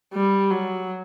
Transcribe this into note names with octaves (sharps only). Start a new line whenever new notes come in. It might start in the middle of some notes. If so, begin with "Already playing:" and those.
G3
F#3